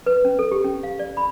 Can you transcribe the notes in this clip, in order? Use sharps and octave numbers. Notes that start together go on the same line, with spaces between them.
B4
C#4
A4
G4
C#4
F5
D5
B5